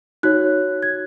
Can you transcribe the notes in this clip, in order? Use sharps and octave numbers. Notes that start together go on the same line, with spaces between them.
D#4 F#4 C#5 F#6
G#6